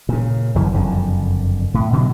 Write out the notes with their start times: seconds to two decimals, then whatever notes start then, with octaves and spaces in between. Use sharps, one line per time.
0.09 A#2 C#3
0.55 G1 F#2 C#3 E3
0.74 F#1 F2 D3
1.74 A2
1.93 B2 D3 D#3 F#3